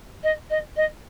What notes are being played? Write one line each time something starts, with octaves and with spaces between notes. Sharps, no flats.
D#5
D#5
D#5